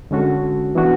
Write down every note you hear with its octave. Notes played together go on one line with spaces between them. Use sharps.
D3 G#3 C#4 F#4 A4
E3 B3 D4 F#4